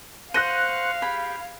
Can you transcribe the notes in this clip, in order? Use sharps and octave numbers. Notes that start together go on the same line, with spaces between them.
C5 F5 F#5 C#6 F#6 A#6 D#7
G4 G#4 B5